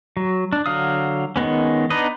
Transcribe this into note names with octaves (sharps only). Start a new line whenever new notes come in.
F#3
D4
D3 F#3 F5 D#6
D#3 G#3 B3 C#4
B3 D4 D#4 B4 D#5